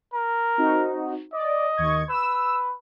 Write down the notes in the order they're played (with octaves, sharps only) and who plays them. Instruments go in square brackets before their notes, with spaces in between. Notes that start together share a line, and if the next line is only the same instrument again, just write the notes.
[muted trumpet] A#4
[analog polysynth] C4 D#4 F#4
[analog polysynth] D5 [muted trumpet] D#5
[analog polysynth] D#2 C#6 G#6
[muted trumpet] B4 [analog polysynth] E6